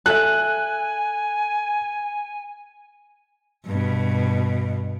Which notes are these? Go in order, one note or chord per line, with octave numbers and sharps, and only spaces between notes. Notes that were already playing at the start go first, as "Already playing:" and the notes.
A4 E5 G#5 F#6
G2 B2